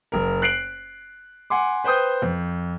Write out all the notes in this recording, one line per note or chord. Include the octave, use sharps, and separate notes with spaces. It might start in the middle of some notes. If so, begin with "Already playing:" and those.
F#1 A#4
F#6 C7 D7 F#7
F#5 G#5 C6 D6
B4 C5 G5 D#6 G6
F2